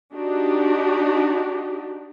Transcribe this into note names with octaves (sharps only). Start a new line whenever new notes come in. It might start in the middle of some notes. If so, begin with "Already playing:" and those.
D4 D#4 F#4 G4